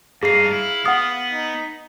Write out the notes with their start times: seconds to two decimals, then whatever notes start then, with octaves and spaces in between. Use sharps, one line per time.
0.23 G2 D#4 G#4 F5 C7
0.52 E4
0.86 B3 F#5 D#6
1.33 D#4